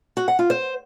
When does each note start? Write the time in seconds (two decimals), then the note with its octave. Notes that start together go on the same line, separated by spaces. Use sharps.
0.17 F#4
0.28 F#5
0.39 F4
0.50 C5